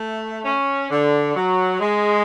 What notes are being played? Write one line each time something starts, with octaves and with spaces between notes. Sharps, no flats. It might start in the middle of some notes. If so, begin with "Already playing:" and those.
Already playing: A3
C#4
D3
F#3
G#3